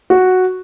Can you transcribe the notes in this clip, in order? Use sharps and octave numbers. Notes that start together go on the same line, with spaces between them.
F#4